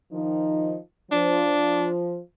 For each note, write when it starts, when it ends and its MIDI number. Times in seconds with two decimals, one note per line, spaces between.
0.12 0.75 51
0.12 0.75 53
0.12 0.75 63
1.11 2.18 53
1.11 1.88 62